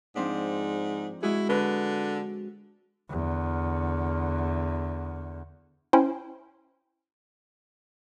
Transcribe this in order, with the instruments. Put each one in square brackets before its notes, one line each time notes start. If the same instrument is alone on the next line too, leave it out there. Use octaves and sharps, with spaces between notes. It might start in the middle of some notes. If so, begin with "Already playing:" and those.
[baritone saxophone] G#2 [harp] F3 C4 D4
[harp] G#3 F#4 G#4 [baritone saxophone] E4
[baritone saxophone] D3 [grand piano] B4
[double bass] E2 D3
[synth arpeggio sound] C#4 E4 C5 G5 C6